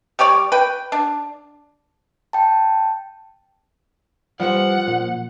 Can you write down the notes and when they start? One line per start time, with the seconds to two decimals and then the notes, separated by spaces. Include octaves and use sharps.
0.19 G3 G4 C#5 D5
0.52 B4 G5
0.92 D4
2.33 G5 A5
4.40 E3 F3 G3 C5 F#5
4.88 F#2 A#2